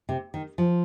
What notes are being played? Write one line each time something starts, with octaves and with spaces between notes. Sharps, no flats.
C3
D#3
F3